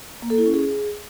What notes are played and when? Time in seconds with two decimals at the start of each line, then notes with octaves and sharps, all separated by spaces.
0.22 A#3
0.30 A4
0.38 E4
0.46 C#4
0.54 G#4